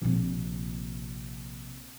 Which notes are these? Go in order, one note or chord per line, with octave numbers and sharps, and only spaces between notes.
A#1 C3